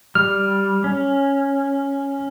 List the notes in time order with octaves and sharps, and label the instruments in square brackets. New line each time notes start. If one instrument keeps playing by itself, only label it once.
[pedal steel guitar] G3 [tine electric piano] F6
[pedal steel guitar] C#4